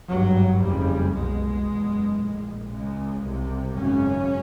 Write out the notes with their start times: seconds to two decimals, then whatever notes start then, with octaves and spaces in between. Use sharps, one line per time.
0.10 G#1 G2 F#3
0.63 F#1 F2 C#3 G3
1.15 C2 B2 G#3
1.68 F#1 E2 B2
2.19 A#1 A2
2.71 C#2 C#3 G#3
3.23 C2 C3
3.75 G#1 F#2 C#3 C#4